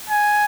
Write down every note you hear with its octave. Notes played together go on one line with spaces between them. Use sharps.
G#5